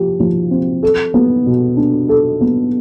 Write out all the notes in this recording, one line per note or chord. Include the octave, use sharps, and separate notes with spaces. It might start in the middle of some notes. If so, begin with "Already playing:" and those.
Already playing: F3 G4
F3
C4
A4
B3
B2
D4
A4
B3